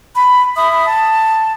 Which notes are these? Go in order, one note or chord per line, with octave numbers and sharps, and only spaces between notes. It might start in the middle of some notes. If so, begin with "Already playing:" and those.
B5
E5 B5 D#6
A5